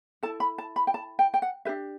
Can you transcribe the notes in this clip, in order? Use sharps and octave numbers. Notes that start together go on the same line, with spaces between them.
E4 A4 A5
B5
A5
B5
G5
A5
G5
G5
F#5
D4 G4 B4 E5